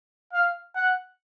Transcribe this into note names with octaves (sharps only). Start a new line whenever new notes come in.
F5
F#5